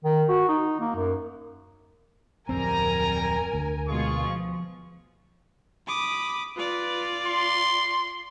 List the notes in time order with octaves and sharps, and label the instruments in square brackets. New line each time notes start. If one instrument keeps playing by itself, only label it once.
[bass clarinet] D#3
F#4
D#4
A#3
F#2
[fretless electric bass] D1 F2 C4 [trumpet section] G3 A#5 [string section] A#4 G#5
[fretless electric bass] D2
[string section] B2 G#3 F4 [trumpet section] G#4 C#6
[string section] F3
[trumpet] B5 [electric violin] D6 D#6
[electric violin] F4 D5 [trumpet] B4
[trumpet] C6